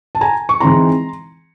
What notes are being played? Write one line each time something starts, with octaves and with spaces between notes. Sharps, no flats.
A5
G#5 A#5
C#6
E3 G#3 C4 D#4 A#5 C6